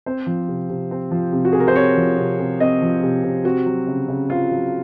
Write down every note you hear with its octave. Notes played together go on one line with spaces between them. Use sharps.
C4 C5
F3
C3
C3
C4
F3
C3
F#4
C3 G#4
A#4
C5
C4 C#5
F3
C3
C3
C4 D#5
F3
C3
C3
C4 F#4
F#3
C#3
C#3
C4 F4
F#3